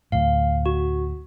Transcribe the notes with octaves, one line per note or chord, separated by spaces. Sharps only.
D2 A2 F5
F#4